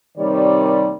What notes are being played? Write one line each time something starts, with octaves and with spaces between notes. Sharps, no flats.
C3 D#3 G3 A#3 C#5 D5